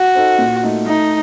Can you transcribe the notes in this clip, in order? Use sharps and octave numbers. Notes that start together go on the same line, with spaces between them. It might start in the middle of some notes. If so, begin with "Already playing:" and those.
Already playing: F#4
D#4 A4 C5
A#2
A3 D#4 F#4
A3 D#4